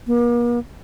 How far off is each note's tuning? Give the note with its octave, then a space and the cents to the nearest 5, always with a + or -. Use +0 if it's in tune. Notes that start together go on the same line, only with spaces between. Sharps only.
A#3 +45